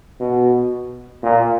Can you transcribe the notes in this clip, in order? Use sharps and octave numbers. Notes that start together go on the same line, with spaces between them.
B2
A#2